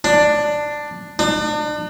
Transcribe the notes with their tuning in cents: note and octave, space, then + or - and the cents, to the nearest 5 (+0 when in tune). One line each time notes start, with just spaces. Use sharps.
D4 +10
D4 +40